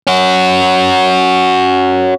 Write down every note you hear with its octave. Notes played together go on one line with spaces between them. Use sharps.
C#4 F#4